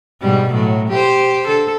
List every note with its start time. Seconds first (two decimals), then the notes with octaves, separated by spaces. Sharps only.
0.21 G#2 B2 G3
0.52 A2 F#3
0.89 G4 C5
1.45 D3 A4